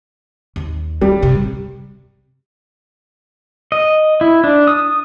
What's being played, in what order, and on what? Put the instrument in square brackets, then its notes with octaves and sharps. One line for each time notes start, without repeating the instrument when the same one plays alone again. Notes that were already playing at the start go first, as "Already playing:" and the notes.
[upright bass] D#2
[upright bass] D#3 [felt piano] G3
[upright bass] G2 C3
[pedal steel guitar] D#5
E4
D4
D#6